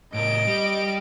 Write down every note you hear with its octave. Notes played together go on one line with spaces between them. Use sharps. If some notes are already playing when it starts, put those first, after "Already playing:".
A2 A#4 D#5 D7
G3